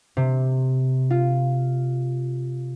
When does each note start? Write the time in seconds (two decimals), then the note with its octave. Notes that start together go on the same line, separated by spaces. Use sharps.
0.17 C3
1.10 F4